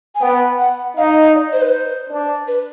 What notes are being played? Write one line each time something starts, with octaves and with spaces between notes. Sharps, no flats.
G#5
B3 G5
F#5
D#4 F5
D#5
D5
C5
B4
C5
D4
B4